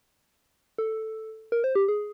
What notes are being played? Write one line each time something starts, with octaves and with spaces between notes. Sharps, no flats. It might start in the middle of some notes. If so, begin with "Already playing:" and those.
A4
A#4
C5
G4
G#4